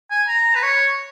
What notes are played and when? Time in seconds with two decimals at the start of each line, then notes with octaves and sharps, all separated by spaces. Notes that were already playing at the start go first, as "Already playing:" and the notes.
0.11 G#5
0.28 A#5
0.55 B4
0.63 C#5